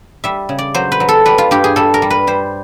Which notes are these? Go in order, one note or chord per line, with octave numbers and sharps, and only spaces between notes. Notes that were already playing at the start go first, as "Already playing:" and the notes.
G3 E5
C#3
D5
F#3 C5
B4
F#3
A4
G3 B4
F4
G2 G4
G#4
G3 A4
A#4
G3
B4
G3 C5